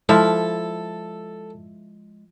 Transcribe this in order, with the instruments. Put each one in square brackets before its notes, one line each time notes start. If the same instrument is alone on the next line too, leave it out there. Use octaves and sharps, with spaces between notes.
[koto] F3 [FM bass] G#3 [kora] E4 [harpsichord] A4